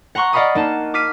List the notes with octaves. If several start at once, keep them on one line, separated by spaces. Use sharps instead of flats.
F#5 A#5 C6 C#6 F#6
D5 D#5 F5 F#5 B5 D#6
A#3 D#4 A5
D6 F6 B6 C7 D#7